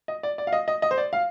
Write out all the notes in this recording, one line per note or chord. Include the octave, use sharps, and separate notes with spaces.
D#5
D5
D5
F5
D#5
D#5
D#5
C5
D5
F5